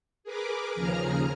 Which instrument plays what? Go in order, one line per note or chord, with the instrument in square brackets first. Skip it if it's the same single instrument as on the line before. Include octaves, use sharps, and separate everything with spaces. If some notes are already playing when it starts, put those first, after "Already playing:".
[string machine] G#4 A#4 B4 D6
D#2 C#3 F3 G#4 A#5 F6